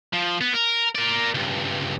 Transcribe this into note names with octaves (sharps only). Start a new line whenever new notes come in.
F3
B3
A#4
A#4 D5
C#2 G2